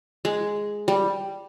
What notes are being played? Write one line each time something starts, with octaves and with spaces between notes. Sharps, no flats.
G#3
G3